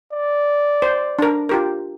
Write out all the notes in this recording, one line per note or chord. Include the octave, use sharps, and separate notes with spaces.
D5
C5
D4 A#4
F4 G4 A#4